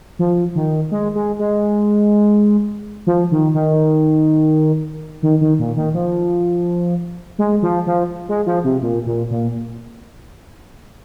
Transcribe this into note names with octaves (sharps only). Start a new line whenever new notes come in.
F3
D#3
G#3
G#3
G#3
F3
D#3
D#3
D#3
D#3
A#2
D#3
F3
G#3
F3
F3
G#3
F3
C3
A#2
A#2
A#2